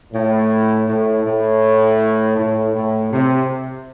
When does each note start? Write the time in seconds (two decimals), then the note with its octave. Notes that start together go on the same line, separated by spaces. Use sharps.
0.12 A2
0.87 A2
1.24 A2
2.37 A2
2.74 A2
3.11 C3